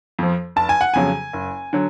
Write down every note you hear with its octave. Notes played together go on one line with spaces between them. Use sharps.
F2 F3
F1 A5
G#5
F#5
F2 C#3 F#3 G#5
F#1
D3 F#3